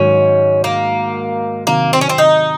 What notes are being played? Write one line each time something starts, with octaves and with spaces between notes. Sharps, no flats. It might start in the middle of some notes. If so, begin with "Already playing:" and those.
Already playing: G#2 D#3 F#3 C#4
A#3
C3 D#3 F#3 A#3
C4
C#4
C4
D#4